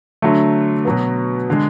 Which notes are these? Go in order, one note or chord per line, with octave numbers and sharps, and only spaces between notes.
D3 F#3 A3
B2 F#3 B3
D3 G#3